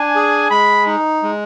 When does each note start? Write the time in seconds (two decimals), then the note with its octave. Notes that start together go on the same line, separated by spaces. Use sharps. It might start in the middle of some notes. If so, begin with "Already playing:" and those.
Already playing: D4 G#5
0.15 G#4
0.50 G#3 B5
0.86 D#4
1.22 G#3